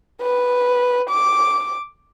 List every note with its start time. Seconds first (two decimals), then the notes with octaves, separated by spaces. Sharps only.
0.21 B4
1.10 D6